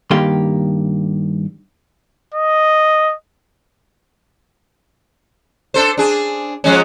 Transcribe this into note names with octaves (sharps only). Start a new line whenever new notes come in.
G2 D#3 A#3 G4 C6
D#5
D4 A4 C5
D4 G#4
F3 G#3 C#4